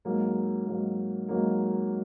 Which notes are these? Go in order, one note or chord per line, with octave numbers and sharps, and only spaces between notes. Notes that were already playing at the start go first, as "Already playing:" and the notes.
G#2 F#3 A#3
G#2 F#3 A#3
G#2 F#3 A#3